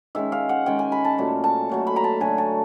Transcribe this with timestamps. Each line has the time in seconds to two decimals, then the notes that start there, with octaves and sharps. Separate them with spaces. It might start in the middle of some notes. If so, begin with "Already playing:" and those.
0.15 D#3 G#3 C#4 E5
0.32 F5
0.49 F#5
0.66 D#3 G#3 C#4 G5
0.79 G#5
0.92 B5
1.05 A5
1.18 A#2 F#3 A3
1.44 A5
1.69 A#2 F#3 A3
1.87 B5
1.96 A#5
2.04 A5
2.20 D3 F#3 A3 G#5
2.38 A5